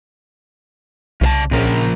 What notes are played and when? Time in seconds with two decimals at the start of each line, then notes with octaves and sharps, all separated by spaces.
1.21 C2 C#3 C5 A5
1.51 A#1 A#2 C#3 F3 A#4 A#5